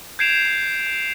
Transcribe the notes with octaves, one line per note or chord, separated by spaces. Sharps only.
G6 G#6 C7 D7 E7 F7